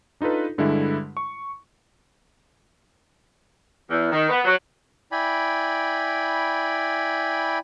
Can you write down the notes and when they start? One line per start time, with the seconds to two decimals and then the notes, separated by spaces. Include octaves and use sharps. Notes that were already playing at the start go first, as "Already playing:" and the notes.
0.21 D4 D#4 F4 A4 B4
0.58 G2 D3 G3 G#3 E4
1.17 C#6
3.90 E2
4.11 D#3
4.29 B3
4.45 F#3
5.12 E4 D5 G5 G#5 B5